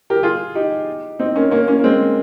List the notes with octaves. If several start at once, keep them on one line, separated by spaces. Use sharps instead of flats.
G4 A#4
F4 G#4
D#4 G4
C4 D#4
A#3 C#4
A#3 C#4
A#3 C#4
A#3
G#3 C4